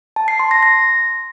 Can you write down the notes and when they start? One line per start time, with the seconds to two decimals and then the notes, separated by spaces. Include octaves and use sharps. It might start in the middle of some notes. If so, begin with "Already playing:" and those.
0.16 A5
0.28 C7
0.39 C6
0.51 A#6
0.63 A#6